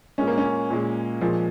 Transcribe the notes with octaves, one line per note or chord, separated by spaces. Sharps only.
A#2 G#3 C#4
A#3
C#4
A#2 G#3
A#2 F3 G#3